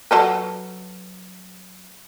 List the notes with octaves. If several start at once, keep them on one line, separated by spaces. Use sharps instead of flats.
F#3 A4 B4